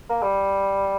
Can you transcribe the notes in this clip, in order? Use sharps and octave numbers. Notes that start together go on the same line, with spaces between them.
A#3
G3